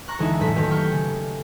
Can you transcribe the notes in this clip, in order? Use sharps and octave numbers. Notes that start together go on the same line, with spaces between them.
A#5 C#6 F#6
D2 E3 G#3 D#4 E5 G#5
F#1 E2 A2 A3 F#6 B6
D#3 A3 A#3 F#4 G4 B4
B5 C#6 F6 G6
C#3